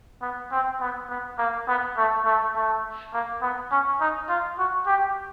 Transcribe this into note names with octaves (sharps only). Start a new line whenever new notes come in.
B3
C4
B3
B3
A#3
B3
A3
A3
A3
A#3
B3
C#4
D#4
F4
F#4
G4